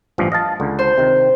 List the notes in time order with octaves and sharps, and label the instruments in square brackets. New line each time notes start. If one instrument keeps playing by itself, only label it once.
[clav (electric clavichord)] A1 G2 F3
D#5 F5 A5
C#2 D3
[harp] C5
[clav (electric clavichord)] C3 D#3